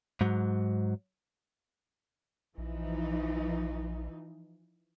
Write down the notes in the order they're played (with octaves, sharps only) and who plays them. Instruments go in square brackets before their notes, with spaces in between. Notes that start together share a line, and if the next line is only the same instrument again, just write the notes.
[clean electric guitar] G#2 F#3
[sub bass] A#1 [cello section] E3 F3 D#4